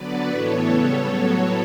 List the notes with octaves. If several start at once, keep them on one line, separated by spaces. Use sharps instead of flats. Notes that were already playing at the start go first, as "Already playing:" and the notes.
Already playing: D3 F#3 B3 B4 D5
A2 E3 B3 A4 C#5
C#3 G3 B3
A2 F#3 B3